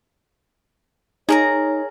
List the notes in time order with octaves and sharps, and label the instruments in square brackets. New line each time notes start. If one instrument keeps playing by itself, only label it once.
[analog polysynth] D#4 [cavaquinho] G#4 A#4 A#5 [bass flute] C#5